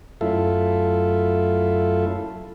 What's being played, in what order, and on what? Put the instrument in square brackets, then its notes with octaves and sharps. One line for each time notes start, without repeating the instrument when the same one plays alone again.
[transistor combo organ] F#2 A3 E4 F4 A4